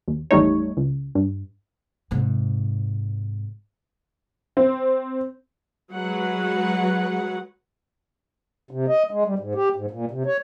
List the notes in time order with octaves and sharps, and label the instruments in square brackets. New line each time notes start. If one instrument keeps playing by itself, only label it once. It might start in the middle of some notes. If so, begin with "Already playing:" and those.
[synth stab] D#2
G#1 E2 G3 A3 D#4 C#5
C#2
G2
[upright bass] G#2 C3
[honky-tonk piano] C4
[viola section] F#3 G#3 B4 F#5
[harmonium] C3
D#5
G#3
G3
G#2
G4
G#2
A#2
C3
C#5